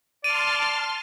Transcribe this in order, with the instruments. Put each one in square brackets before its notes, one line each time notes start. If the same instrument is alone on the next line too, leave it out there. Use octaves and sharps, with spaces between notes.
[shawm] D5 [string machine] A5 C6 F6 [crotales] D#7